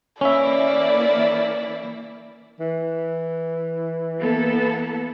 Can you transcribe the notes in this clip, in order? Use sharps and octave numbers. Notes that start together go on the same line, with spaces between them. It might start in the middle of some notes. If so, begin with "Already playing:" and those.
E3 A#3 C#4 E4 D5 E5
E3
A#3 B3 A4